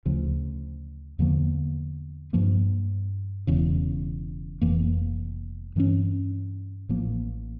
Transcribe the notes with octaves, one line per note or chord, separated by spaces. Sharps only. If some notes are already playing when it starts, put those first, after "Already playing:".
D2 C#3 F3
E2 D3 F3 A#3
G2 F3 A#3
E1 E2 C#3
F1 F2 E3 A#3
G2 E3 A3 C#4
A1 A2 F3 A#3